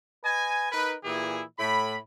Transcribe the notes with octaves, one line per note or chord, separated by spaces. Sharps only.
B4 D#5 G#5
D#4 A#4 B4
A#2 E3 E4 G4 G#4
A2 B5